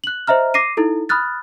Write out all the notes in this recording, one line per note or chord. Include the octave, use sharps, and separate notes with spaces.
F#6 F#7
C5 D#5 E5 A#5 F6
D6 A#6 C7 D#7
D#4 E4 A4
B5 D#6 F6 F#6 A6